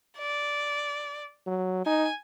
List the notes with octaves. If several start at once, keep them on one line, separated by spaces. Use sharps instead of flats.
D5
F#3
D#4 G#5